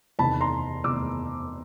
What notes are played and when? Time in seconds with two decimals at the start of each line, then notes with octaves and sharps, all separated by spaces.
0.19 E2 C3 D#3 A5 B5
0.41 A#5 C6
0.84 E2 C3 D#3 D6 E6